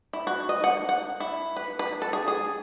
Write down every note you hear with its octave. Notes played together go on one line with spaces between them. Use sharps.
E4
F#4
D#5
F#5
F#5
E4
B4
B4
A4
G#4
G#4